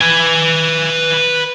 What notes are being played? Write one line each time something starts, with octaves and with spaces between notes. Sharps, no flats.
B4 G#5